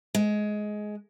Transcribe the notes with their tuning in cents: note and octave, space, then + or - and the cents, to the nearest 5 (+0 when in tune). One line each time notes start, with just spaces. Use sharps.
G#3 +15